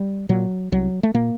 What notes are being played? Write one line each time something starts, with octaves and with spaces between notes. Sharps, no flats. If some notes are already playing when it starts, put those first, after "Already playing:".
Already playing: G3
A#2 F#3
C2 F#3
A3
A#2 A#3